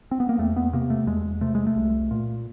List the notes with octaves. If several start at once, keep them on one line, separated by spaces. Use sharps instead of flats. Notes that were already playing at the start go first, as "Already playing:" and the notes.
C4
B3
A#3
E2 A3
B3
C3 A#3
A3
E2 G#3
C3 A3
G#3
A3
C2
A#2